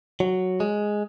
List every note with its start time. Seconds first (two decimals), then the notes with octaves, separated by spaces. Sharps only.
0.20 F#3
0.60 G#3